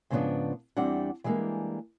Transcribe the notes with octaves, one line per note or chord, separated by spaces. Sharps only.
G#2 C#3 F3 A#3 B3 D4
E2 G3 C4 D4 F#5
E3 G3 G#3 A#3 D4